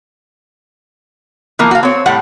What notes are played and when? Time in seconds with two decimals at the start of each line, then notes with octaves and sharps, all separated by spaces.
1.59 E3 F3 A#3
1.71 F#4 F5
1.83 C4 C#5
2.06 A2 G3 F#5